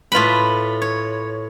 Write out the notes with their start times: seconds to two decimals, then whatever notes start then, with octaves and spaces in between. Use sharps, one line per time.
0.12 A2 F4 B4 B5
0.82 C#5